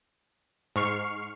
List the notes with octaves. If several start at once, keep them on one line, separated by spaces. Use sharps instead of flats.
G#2 C#6 F6 C7